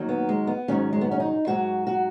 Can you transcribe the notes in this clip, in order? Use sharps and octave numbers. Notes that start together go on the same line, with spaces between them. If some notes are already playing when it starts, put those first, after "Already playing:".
Already playing: D#2 D#3 F#3
B3
G#3
B3
G#2 D#3 F#3 C#4
G#3
B3
C#4
D#4
G#2 F#3 F#4
F#4